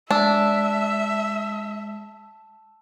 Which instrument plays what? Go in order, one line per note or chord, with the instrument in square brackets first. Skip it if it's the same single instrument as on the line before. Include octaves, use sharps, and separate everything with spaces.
[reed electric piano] G#3 [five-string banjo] D4 [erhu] E5 [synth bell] A5 E6